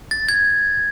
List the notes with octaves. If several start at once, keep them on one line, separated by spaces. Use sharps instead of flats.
A6
G#6